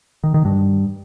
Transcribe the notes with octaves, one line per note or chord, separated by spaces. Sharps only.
D#3
D#3
G2